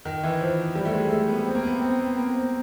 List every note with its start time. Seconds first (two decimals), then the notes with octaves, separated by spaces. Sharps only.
0.05 D#3
0.24 E3
0.41 F3
0.75 G3
0.85 A3
0.93 G#3
1.10 A3
1.28 B3
1.46 C4
1.55 A#3
1.63 B3
1.81 C4
1.99 B3
2.17 A#3
2.34 C4